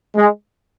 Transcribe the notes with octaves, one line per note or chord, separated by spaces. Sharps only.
G#3